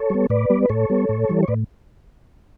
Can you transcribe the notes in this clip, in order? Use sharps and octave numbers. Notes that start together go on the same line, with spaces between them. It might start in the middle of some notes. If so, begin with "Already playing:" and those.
Already playing: A4 C#5
G3 B3
A2 B4 D5
G3 B3
B4
A2 A4 C#5
G3 B3
A2
E3 G3
C#5
A2 B4 D5